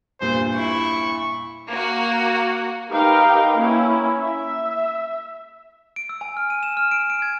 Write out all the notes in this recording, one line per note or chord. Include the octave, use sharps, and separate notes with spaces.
E2 G2 A#2 C5
E4 C#6
A#3 F#4
D#4 G4 A#4 B4 F5 G5
A#3 C#4 E4
E5
D7
E6
G#5
F6
D#7
E7
F6
D7
D7
G#6